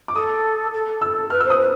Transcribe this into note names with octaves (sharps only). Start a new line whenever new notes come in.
D6
A4 D#6
A4
E6
B4 F6
C5 E6
D#6
B4